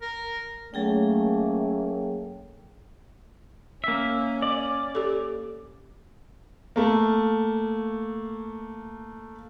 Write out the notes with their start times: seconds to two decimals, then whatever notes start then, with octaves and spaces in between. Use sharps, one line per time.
0.02 A#4
0.74 F#3 A3 A#3 C#4 G#4 G5
3.84 A#3 C#4 E5
4.42 D5
4.95 G4 A4
6.76 A3 A#3